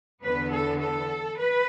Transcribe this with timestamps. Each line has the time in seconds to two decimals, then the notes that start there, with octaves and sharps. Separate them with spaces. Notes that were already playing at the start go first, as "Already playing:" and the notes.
0.22 E2 D3 B3 B4
0.51 A4
0.80 A4
1.38 B4